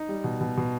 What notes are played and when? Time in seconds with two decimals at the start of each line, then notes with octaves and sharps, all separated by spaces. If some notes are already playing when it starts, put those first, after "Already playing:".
Already playing: D#4
0.09 G3
0.24 B2
0.41 B2
0.57 B2